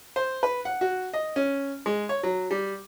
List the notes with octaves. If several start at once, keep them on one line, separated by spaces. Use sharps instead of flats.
C5
B4
F#5
F#4
D#5
C#4
G#3
C#5
F#3
G3